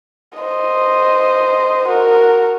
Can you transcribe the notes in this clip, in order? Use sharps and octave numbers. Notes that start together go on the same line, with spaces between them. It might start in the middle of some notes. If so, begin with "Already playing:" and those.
C5 D#5
F#4 A#4